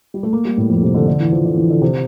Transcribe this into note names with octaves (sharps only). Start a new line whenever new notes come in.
G3
A3
A#3
G3
A2
F2
C3
D3
D3
E3
F3
D3
E3
D3
C3